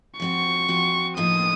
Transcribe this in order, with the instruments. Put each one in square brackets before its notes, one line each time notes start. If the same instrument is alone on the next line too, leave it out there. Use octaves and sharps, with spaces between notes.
[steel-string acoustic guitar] F3 C4 F#4 [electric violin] C#6
[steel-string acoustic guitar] F3 C4 F#4
[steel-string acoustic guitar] A2 F3 A#3 D#4 [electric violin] D#6